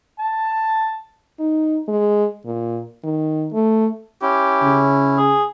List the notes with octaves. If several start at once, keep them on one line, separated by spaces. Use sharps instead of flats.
A5
D#4
G#3
A#2
D#3
A3
C#4 E4 G4
C#3
G#4